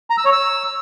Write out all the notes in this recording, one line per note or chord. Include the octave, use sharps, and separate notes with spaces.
A#5
E6
C#5
E6